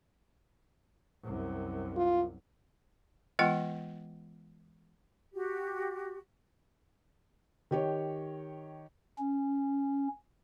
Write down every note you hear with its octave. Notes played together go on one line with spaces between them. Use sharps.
C2 F#2
F4
E3 G#3 B3 F4 F#5 G5
F#4 G4
D#3 G4 C#5
C#4